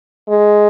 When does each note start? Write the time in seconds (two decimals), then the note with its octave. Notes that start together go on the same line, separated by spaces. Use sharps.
0.29 G#3